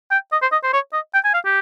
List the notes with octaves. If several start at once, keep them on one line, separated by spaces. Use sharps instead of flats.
G5
D#5
C5
D#5
C5
C#5
D#5
G5
G#5
F5
G4